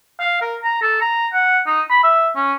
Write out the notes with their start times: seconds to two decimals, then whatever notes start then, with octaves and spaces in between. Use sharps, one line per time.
0.20 F5
0.41 A#4
0.63 A#5
0.82 A4
1.01 A#5
1.33 F#5
1.67 D#4
1.90 B5
2.03 E5
2.36 C#4